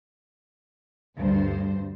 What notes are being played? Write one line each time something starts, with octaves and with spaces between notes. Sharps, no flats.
D2 G2 C5